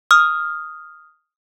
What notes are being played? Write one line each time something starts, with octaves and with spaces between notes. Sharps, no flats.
D#6 F6